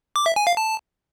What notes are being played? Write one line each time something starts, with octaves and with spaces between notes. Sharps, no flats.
D6
E5
G#5
F5
A5